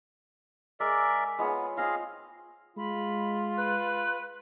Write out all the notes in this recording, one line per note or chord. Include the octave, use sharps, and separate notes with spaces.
G#3 A#4 D5 E5
G#3 B3 F4 C#5
C4 F4 G#4 D#5 F5
G#3 F4 B5
B4 F#6